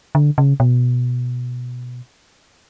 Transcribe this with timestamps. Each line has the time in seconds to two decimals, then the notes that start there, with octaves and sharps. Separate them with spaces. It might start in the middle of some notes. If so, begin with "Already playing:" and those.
0.15 D3
0.38 C#3
0.60 B2